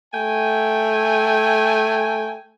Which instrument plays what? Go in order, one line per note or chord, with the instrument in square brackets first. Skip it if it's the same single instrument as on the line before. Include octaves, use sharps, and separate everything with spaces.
[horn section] A3 G5 G#5